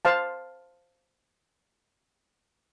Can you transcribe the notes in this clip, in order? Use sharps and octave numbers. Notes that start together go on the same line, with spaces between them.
C5 F5 A5